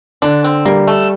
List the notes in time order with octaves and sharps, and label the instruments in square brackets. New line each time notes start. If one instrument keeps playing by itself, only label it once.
[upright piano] D3 [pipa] D4
[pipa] C4
[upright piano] G3 [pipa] A#3
[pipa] A3